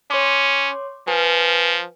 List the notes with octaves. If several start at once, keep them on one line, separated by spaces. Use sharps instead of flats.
C#4 C#5 C6 D6
F3 B4 G#5